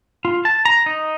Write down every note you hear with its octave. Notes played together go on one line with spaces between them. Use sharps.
F4
A5
A#5
D#4